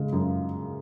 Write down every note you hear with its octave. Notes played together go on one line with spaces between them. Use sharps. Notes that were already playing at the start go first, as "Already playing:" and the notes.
Already playing: C#3 G#3
F#2